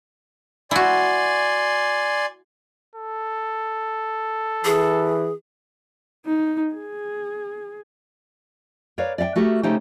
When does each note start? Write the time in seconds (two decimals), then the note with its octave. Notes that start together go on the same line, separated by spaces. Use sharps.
0.71 E4 F#4 D5 G#5 C6
2.95 A4
4.65 E3 G#4
6.26 D#4
6.73 G#4
8.98 A#4 B4 C#5 D5 F5
9.18 D5 E5 F5 G5
9.36 A3 F#4 G4 A#4 E5
9.63 C#3 A3 D#4 G4 C5 G5